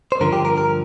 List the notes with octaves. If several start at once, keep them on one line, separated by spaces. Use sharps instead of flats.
C5
G2 D3 F3 A#4
G4
A#4
A#4